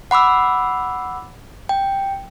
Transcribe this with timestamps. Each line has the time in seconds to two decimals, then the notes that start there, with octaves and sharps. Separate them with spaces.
0.11 F#5 B5 D6 E6
1.69 G5